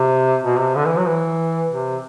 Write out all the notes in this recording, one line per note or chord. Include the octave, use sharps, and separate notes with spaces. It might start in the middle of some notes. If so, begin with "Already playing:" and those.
Already playing: C3
B2
C3
D3
E3
F#3
E3
C3